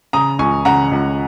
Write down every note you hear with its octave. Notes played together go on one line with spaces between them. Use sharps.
C#3 A#5 D#6
C#2 G#5 C#6
C#3 F#5 A#5
C#2